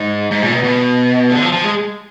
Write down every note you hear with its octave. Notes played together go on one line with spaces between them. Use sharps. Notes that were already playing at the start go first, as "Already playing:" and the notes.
Already playing: G#2
G#2
A#2
B2
B2
D3
F3
F3
G#3